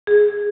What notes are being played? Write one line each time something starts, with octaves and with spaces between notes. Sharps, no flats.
G#4